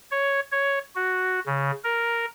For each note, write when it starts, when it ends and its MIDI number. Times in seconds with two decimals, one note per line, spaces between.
0.11 0.40 73
0.52 0.79 73
0.95 1.40 66
1.46 1.71 49
1.84 2.25 70